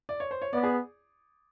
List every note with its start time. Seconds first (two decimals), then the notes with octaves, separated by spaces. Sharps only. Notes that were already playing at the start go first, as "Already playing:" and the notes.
0.09 D5
0.20 C#5
0.31 C5
0.42 C#5
0.53 B3 D5
0.63 G#4